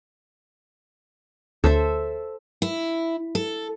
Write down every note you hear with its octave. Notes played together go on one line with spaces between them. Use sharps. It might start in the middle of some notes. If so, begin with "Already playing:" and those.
D2 A4 C5 E5
E4
A4